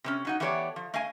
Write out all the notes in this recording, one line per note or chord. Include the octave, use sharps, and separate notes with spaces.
C3 B3 C#4
F#3 D#4 F#5
E3 A3 B3 G4 C#5 D5
F3
A3 D#5 F5 G#5